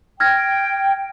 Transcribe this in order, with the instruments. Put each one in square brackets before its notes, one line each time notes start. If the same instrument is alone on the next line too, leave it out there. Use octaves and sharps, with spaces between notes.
[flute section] G5 [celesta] F6 G#6 A#6